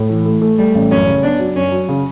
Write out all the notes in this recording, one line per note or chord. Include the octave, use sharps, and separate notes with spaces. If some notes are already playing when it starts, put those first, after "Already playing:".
Already playing: A2
E3
A3
A3
G3 A3
A1
F#2 C#4
C#3
B3 D4
F#3
F#2 C#4
F#3
C#3